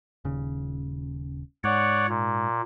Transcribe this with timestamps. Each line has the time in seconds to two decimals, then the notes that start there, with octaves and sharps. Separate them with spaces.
0.25 D#1 C#3
1.64 G#2 C#5 D5 F#5
2.08 A#2